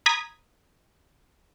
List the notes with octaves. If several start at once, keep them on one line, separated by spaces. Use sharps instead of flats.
A#5 B5 D#6 G#6 B6